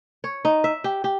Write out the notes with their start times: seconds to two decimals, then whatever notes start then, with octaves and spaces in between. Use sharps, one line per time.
0.24 C#5
0.45 D#4
0.64 E5
0.84 G4
1.04 G4